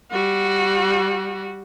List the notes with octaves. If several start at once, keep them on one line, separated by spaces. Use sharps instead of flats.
G3 F#4